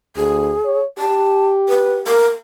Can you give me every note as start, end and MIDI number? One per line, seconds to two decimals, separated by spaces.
0.16 0.55 38
0.16 0.79 68
0.65 0.85 73
0.98 2.17 67
0.98 1.47 81
1.69 1.95 71
2.07 2.28 70